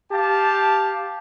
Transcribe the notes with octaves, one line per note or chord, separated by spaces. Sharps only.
G4 F5 A5